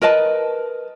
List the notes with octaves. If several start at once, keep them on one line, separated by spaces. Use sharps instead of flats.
A#4 B4 D#5 A5